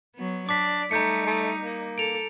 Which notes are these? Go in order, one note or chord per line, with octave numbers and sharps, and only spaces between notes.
F#3 B3
D4 D5 D6 B6
G3 A3 D#4 A#5 G6 C#7
A3
A#3
A4 D7 F7